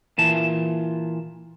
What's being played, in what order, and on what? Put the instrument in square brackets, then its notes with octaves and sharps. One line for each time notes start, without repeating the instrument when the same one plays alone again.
[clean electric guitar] A#2 E3 A5